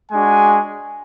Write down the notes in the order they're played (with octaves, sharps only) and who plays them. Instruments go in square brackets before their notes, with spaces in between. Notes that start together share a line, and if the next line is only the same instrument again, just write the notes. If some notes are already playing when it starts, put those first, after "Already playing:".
[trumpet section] G#3 D4 F#4 G#5